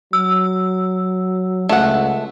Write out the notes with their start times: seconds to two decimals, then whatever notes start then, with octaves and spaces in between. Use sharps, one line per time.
0.13 F#3 E6
1.69 C#2 A3 F#5